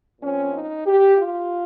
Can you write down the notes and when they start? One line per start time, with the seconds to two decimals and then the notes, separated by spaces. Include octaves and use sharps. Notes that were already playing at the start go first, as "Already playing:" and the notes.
0.21 A#2 F3 C4 C#4
0.53 D#4
0.86 G4
1.18 F4